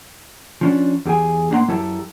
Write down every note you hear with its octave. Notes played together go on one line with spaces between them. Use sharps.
F3 C#4 D4
E2 G4 G#4 G#5
A2 A#3 D4 F#4 F#5 C6
F#2 F#3 E4 G4 A4 A5